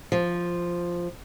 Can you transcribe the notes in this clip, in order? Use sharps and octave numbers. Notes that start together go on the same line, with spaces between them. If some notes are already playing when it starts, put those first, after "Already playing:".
F3